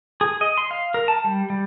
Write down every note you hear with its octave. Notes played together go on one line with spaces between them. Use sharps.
G#4
D#5
C6
F5
A#4
A5
G3
G3